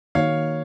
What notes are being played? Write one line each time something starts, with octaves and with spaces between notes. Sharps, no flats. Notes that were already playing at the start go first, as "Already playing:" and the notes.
D#3 A#3 D#4 F#4 C#5 F5